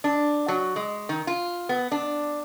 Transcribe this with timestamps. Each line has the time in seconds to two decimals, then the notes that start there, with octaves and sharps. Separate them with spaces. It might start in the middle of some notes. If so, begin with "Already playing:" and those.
0.04 D4
0.48 F#3
0.76 G#3
1.09 D#3
1.27 F4
1.69 B3
1.92 D4